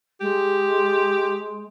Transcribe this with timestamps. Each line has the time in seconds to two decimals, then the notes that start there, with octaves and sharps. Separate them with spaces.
0.21 G#3 G4